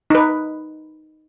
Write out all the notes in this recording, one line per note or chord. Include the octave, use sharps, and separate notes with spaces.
D#4 B4